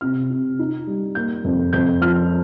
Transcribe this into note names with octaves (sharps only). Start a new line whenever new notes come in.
C3 F6
C3
D#4
G3
A#3 G6
F2
F2 G6
F3 F6